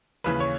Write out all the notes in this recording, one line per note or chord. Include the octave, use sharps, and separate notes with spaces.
D#2 C#3 E3 B4
C#5